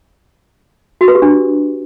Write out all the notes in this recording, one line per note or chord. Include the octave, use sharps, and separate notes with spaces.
F#4
B4
G4
D4